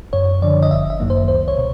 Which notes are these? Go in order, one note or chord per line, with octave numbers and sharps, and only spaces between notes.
F#2 C#5
D3 F3 D5
D#5
G1 E5
E5
F#2 D#3 F#3 A#3
C5
C#2 C5
C#5
B2